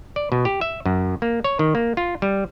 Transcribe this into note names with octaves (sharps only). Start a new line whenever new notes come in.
D5
B2
G4
E5
F#2
A#3
C#5
D#3
A#3
F4
G3